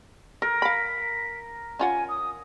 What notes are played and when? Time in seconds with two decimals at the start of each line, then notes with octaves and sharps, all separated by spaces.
0.42 A4 A#4
0.62 F5 B5 B6
1.79 C#4 F4 F#5 G#5
2.09 D#6